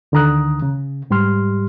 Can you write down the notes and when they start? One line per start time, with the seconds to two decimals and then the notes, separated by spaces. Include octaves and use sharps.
0.12 D2 D3 D#3 A#5 D#6 F#6
0.62 C#3
1.10 G#2 G3 G4 C6 F6